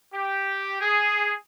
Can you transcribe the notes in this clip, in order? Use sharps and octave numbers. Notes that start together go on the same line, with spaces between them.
G4
G#4